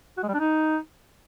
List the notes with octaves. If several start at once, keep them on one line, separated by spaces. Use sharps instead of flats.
F#4
G#3
G3
D4
D#4